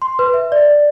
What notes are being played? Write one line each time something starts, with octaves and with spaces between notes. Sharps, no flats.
C6
B4
E5
D5